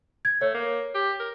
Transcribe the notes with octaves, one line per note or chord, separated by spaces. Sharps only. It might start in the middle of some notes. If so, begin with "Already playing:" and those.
G#6
A3 C#5
A#3
G4
A#4